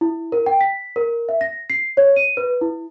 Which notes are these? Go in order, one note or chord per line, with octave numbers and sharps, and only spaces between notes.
E4
A#4
G5
B6
A#4
E5
A#6
C7
C#5
D#7
B4
E4